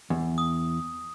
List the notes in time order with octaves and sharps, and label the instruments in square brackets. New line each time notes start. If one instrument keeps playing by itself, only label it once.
[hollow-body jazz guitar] E2
[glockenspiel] D#6